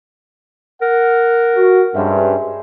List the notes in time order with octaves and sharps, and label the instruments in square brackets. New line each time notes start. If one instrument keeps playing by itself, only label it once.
[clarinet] A#4 [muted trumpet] F#5
[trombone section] F#4
[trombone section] G2 [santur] G#3 C5 E5 [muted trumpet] C#4